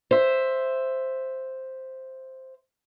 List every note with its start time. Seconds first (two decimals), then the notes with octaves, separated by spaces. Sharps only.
0.11 C5 E5